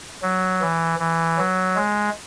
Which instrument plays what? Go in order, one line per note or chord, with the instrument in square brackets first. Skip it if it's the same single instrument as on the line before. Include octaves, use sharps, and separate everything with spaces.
[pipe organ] F#3
E3
E3
F#3
G#3